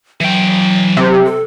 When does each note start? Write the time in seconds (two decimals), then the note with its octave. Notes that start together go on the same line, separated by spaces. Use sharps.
0.21 E3 F#3 G5
0.97 C3
1.25 A4